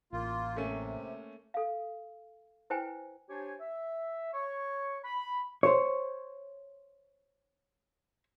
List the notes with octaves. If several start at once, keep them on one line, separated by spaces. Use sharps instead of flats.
A1 A#3 F4
C3 A3 A#3 C#4
A4 F5
E4 B4 C5 G5 G#5
D4 G4 C5 C#5 G#5
E5
C#5 C#6
B5
C5 C#5